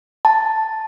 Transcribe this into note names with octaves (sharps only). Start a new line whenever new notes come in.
A5